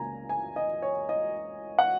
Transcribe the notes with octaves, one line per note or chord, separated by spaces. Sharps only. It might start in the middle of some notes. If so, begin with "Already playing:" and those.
Already playing: C#2 C#3 A#3 G#5 A#5
G#5
D#5
C#5
D#5
F#5